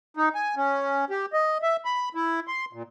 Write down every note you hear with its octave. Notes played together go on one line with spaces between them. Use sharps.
D#4
G#5
C#4
G4
D#5
E5
B5
E4
C6
A#2